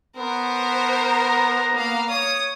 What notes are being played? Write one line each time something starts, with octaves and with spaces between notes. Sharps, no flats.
B3 A#4 C5
A#5
A#3 F5
C#5 D#6